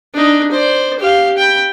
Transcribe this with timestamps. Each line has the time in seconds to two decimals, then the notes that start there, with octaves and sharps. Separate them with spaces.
0.14 D4 D#4
0.52 C5 D5
1.00 G4 F5
1.38 G5 B5